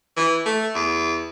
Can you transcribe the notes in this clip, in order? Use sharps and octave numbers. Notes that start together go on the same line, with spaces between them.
E3
A3
E2